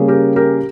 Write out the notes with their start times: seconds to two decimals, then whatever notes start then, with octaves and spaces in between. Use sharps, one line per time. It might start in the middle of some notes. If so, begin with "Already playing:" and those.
Already playing: C#3 G3 A#3 C#4 G#4
0.08 G4 A#4
0.36 G4 A#4